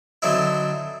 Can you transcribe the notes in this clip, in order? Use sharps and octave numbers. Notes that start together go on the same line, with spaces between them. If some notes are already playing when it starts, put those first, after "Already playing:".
D3 F#3 C4 D#4 E4